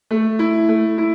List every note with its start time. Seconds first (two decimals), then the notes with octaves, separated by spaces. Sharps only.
0.11 A3
0.39 E4
0.69 A3
0.98 E4